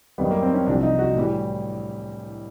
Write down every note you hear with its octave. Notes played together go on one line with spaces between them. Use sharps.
F#2 D#3 G3 B3
A#3
C4
C#4
C2 C3 F3 D4
D#4
F#4
A2 E3 G3